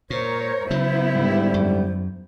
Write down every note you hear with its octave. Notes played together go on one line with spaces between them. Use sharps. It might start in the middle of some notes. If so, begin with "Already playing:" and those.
A#2 A#4 C5 C#5
C#3 F#3 B3 E4
G#2 D3 G3
F#2